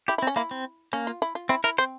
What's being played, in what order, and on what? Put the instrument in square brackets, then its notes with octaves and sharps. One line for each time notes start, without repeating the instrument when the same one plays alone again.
[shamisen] E4 [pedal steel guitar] G4
[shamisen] E4
[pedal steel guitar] C4
[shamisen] C#4
[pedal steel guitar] A#3 [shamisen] E4
[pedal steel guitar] C4
[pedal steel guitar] A#3 [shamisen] C#4
[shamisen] F4
E4
F4
[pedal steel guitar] C4 [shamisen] E4
[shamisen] E4 [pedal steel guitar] A#4
[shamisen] C4 [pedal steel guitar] C5